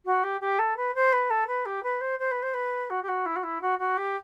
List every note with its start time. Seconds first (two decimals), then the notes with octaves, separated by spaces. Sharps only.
0.05 F#4
0.23 G4
0.41 G4
0.59 A4
0.77 B4
0.95 C5
1.13 B4
1.30 A4
1.47 B4
1.66 G4
1.83 B4
2.01 C5
2.19 C5
2.31 B4
2.42 C5
2.54 B4
2.90 F#4
3.03 G4
3.08 F#4
3.26 E4
3.36 F#4
3.43 E4
3.61 F#4
3.79 F#4
3.97 G4